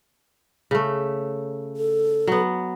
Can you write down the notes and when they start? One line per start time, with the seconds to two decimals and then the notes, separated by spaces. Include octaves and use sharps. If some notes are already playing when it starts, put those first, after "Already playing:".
0.71 C#3 A3
1.77 A4
2.27 F#3 B3